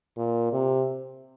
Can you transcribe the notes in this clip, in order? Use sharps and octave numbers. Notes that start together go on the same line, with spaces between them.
A#2
C3